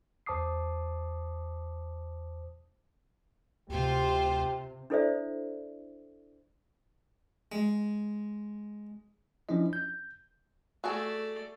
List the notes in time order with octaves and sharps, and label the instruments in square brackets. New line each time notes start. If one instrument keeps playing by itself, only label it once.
[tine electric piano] E2 C5 A5 D6 D#6 C7
[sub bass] D2 [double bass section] C3 [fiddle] F4 C5 [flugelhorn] G4
[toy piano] D4 E4 A4 C5 D5 E5
[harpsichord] G#3
[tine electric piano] F3 C#4 D4 E4 D#5
G6
[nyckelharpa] A3 D5 [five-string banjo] F#4 G#4 A4